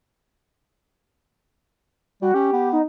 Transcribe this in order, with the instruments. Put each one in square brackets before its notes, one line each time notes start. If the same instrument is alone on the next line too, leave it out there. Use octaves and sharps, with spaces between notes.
[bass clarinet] G3 [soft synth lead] F#4
[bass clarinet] C#4 [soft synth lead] G4
[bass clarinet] B3
[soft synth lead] D#4